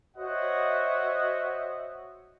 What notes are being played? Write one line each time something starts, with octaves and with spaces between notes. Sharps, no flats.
F#4 C5 C#5 D#5 E5 F#5